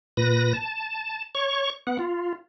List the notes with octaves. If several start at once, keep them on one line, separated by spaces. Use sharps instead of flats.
A#2 B4 A#6
A5
C#5 C#6
B3 F#5
F4